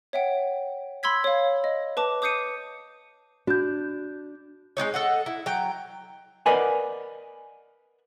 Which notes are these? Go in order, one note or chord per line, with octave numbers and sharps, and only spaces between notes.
C#5 E5 F#5 G5
B5 C6 E6 G#6 B6
C#5 F5
D#5
B4 A5 D6
D6 D#6 G6 C7 C#7 D#7
D4 F#4 G6
G#3 C#4 D#4 C#5
A4 D#5 F#5
E4
F#3 G5
A#4 B4 D5 D#5 F#5 G#5